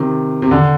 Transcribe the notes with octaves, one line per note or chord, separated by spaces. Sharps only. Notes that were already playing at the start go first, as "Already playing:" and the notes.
Already playing: C3 D#3
C3
D3